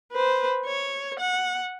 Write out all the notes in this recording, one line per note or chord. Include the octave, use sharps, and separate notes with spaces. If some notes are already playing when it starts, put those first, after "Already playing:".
B4 C5
C#5
F#5